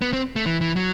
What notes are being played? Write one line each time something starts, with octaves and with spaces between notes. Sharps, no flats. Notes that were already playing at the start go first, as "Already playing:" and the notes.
B3
C4
A3
E3
E3
F#3